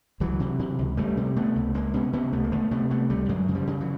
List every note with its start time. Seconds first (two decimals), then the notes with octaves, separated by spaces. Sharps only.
0.20 C#2 E3 F#3
0.40 C3
0.59 C3
0.79 C#2
0.97 C#2 G3 A3
1.17 C3
1.36 C3 A3 B3
1.56 C#2
1.74 C#2 G#3 A#3
1.94 C3 B3 C#4
2.13 C3 B3 C#4
2.32 C#2 A3 B3
2.44 A#3
2.52 C#2 A3 B3
2.71 C3 A3 B3
2.90 C3 A3 B3
3.10 C#2 G3 A3
3.28 F#2 F#3 G#3
3.48 C#3
3.55 F3 G3
3.67 C#3
3.80 E3 F#3